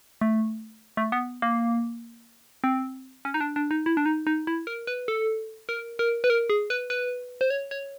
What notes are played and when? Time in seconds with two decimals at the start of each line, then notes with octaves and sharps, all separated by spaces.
0.21 A3
0.97 A3
1.12 B3
1.42 A#3
2.64 C4
3.25 C#4
3.34 D#4
3.41 D4
3.56 D4
3.71 D#4
3.86 E4
3.97 D4
4.06 D#4
4.27 D#4
4.47 E4
4.67 A#4
4.87 B4
5.08 A4
5.69 A#4
5.99 A#4
6.24 B4
6.30 A#4
6.50 G#4
6.70 B4
6.90 B4
7.41 C5
7.50 C#5
7.71 C#5